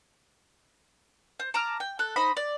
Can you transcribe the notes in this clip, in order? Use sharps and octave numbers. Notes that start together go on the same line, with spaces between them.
C5
A5 A#5 D6 F6
G5
A4 F#6
D#4 C5 D#5 B5
D5